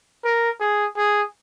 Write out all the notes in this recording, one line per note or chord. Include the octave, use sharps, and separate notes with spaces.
A#4
G#4
G#4